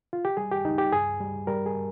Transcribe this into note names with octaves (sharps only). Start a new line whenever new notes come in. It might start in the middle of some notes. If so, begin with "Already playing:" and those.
F4
G4
G3 G#4
G4
C#2 D#4
G4
G2 G#4
G3
G3 A#4
G#4